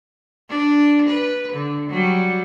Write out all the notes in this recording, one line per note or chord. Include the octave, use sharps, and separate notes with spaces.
D4
B4
D3
F#3 G3